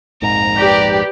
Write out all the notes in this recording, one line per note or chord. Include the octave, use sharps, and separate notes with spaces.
A#1 F2 G#2 A#5
G4 B4 D5